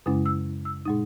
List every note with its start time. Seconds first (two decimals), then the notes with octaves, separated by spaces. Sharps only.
0.06 F#2 C#3 G#3 C#4 E4 D#6
0.26 E6
0.65 E6
0.85 A#2 G#3 D#4 D#6